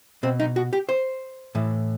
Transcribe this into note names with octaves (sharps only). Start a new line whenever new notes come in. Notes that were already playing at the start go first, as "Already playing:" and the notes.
B2 C4
D#4
F#4
G4
C5
A2 E3